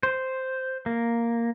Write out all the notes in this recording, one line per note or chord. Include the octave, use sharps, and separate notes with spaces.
C5
A#3